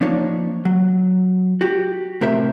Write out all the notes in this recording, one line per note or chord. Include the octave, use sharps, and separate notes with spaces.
F3 A#3 D4 D#4 C#5
F#3
F#4 G4
A2 C3 A#4 C5 E5